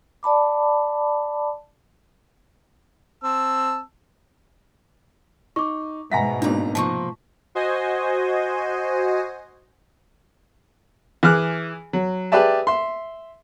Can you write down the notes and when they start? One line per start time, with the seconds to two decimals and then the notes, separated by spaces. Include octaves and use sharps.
0.23 D5 A5 B5 D6
3.24 C4 A5 E6
5.56 D#4 C#6 D6
6.12 G#2 B2 E5 F#5 G#5 A#5 A#6 B6
6.42 G#1 A#3 D4 D#4 A#5
6.75 C3 F3 A#3 A5 C#6
7.55 F#4 C5 D#5 G#5
11.23 E3 G#4 D6 F6 F#6
11.93 F#3
12.32 G4 G#4 B4 D5 E5 A5
12.67 E5 C6